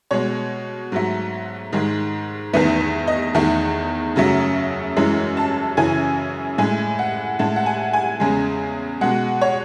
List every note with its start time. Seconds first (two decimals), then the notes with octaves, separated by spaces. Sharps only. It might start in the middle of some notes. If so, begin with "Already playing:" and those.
0.11 B2 G#3 C#5
0.92 G#2 F#3 A3
1.73 G#2 D#3 G#3
2.53 E2 D#3 A3 B4
2.81 B4
3.07 D#5
3.35 E2 D#3 A3
4.16 F#2 C#3 F#3 A3
4.97 F#2 E3 G#3
5.37 A5
5.77 F#2 C#3 E3 G#5
6.58 A2 G#3 G#5
6.99 F#5
7.39 A2 G#3 A5
7.56 F#5
7.66 G#5
7.93 G#5
8.20 E2 C#3 G#3
9.01 B2 G#3 F#5
9.41 C#5